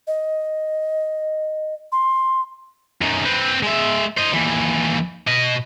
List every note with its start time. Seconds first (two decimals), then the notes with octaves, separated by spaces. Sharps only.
0.07 D#5
1.92 C6
3.01 F#2 D#3
3.25 C4 B4
3.63 G#3 E5
4.17 C5 D#5
4.33 D#2 E3
5.27 B2 D#5